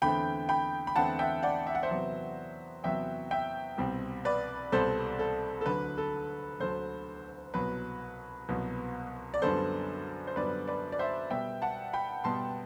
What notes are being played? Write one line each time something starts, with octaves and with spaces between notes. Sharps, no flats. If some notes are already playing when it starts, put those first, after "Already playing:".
E2 D3 A3 C4 G5 B5
G5 B5
B5
E2 D3 A3 C4 F#5 A5
E5 G5
D5 F#5
E5
F#5
C5 E5
E2 C3 F#3 B3
E2 C3 F#3 B3 E5 G5
E5 G5
C2 B2 G3 C4
B4 D5
C2 B2 G3 C4 A4 C5
A4
A4
D2 D3 F#3 B4
A4
D2 D3 F#3 A4 C5
C2 B2 F#3 B3 B4
C2 B2 F#3 B3
D5
F#2 D3 G3 B3 A4 C5
C5
F#2 D3 G3 B3 B4 D5
B4 D5
D5
C5 E5
B2 G3 B3 E5 G5
F#5 A5
G5 B5
B2 G3 B3 A5 C6